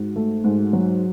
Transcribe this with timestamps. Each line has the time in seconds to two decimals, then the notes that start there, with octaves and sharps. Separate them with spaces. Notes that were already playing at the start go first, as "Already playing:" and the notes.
Already playing: G#2 F#4
0.16 A3
0.44 G#2
0.73 F#3